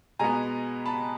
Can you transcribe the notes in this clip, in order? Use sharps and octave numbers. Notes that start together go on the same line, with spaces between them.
B2 G#3 B3 G#5 A#5
A5 B5